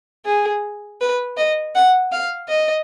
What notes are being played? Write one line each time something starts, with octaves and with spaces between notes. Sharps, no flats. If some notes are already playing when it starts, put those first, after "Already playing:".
G#4
B4
D#5
F#5
F5
D#5